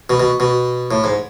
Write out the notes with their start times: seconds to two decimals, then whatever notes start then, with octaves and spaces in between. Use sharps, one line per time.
0.10 B2
0.20 B2
0.40 B2
0.91 A2
1.04 G#2